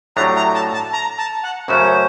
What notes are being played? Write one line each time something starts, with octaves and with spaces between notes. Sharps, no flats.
A2 F#3 A3 D4 G4 A#5
A#5
A5
A5
A#5
A5
F#5
F#2 C#3 F#3 A3 C#4 C5